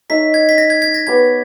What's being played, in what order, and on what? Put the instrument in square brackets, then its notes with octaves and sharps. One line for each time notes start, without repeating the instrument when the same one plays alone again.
[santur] D#4 A#4 C#5 E5 [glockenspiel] B6
[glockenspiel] G#6
B6
A#6
G#6
G#6
A#6
[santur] B3 G4 A#4 C#5 [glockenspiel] G#6